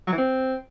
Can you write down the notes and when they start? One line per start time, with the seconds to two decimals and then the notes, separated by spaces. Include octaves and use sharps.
0.07 F#3
0.12 E3
0.18 C4